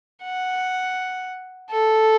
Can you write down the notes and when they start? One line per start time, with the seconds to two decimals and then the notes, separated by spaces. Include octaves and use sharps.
0.24 F#5
1.71 A4